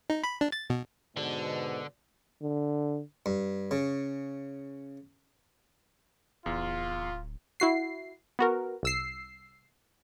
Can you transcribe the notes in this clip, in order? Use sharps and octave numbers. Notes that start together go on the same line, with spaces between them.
D#4
B5
D4
A6
B2
G#2 B2 D3
D3
G2
C#3
D1 E2 F4
E4 F#4 C7
B3 F#4 A#4
C2 E6 C7